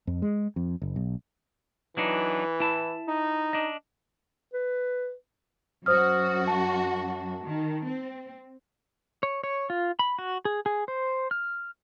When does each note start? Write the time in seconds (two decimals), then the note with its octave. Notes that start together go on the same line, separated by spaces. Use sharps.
0.07 F2
0.22 G#3
0.56 F2
0.82 F#1
0.96 B1
1.97 E3 F#3 D4 D#4
2.60 E4 A5
3.08 D#4
3.53 D4 D#5
4.54 B4
5.86 F#2 F#4 C5 D#6 F6
6.48 A5
7.43 D#3
7.87 C4
9.23 C#5
9.44 C#5
9.70 F4
9.99 B5
10.19 F#4
10.45 G#4
10.66 G#4
10.88 C5
11.31 F6